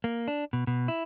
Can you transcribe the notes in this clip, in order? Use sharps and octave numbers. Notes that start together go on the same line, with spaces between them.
A#3
D4
B2
B2
E4